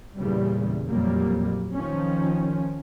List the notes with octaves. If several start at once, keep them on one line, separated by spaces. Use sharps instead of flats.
E2 A#2 C#3 G3
F2 A#2 F#3 G3 A#3
D#3 F3 C#4